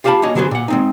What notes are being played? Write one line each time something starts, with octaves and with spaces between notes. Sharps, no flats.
F4 G4 F5 G#5 A5 B5
A#3 C#4 F#4 C#5 D#5
D3 F#3 B3 F#4 G#4 C5
A#2 F#5
G#3 C4 D#4